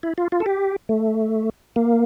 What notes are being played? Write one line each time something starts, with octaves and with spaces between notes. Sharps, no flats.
E4
F4
F4
A4
G4
A3
A#3